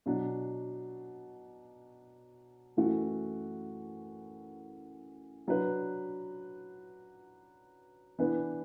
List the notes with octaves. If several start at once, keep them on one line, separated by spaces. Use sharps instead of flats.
B2 F#3 D4
F#2 E3 A3 F#4
F#3 D4 B4
E3 B3 D4 B4